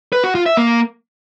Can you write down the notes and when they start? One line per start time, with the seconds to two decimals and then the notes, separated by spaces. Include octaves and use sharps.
0.13 B4
0.24 F#4
0.35 F4
0.46 E5
0.57 A#3